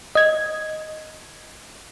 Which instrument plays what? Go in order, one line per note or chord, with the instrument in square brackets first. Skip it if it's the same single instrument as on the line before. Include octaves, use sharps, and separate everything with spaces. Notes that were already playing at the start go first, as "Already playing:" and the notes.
[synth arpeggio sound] D#5 G#6